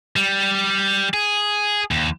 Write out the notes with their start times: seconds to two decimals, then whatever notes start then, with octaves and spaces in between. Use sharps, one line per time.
0.16 G3
1.14 G#4
1.91 D#2